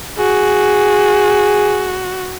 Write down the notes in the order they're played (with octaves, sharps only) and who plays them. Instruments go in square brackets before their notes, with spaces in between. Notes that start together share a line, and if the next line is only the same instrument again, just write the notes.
[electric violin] F#4 [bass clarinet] G#4